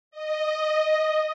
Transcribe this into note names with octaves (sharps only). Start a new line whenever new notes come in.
D#5